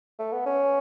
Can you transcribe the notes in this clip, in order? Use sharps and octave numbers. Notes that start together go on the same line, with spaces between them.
A3
B3
C#4